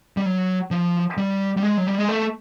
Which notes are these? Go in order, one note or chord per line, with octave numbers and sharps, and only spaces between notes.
G3
F#3
F3
G3
G3
G#3
F#3
G3
G#3
A3